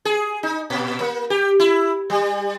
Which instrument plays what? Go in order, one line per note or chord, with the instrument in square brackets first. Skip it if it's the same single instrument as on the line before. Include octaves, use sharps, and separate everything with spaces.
[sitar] G#4
D#4
A#2
A#3
G4
E4
G3